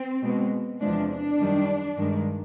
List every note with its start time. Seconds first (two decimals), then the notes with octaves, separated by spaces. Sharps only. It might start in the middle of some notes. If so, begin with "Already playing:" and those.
Already playing: C4
0.23 B2 G#3
0.80 E2 C3 F3 G#3 D4
1.10 D4
1.39 F#2 D#3 G3
1.96 G2 D#3 G#3